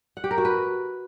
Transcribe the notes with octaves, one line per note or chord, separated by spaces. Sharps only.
F#5
G4
A#4
F#4
B4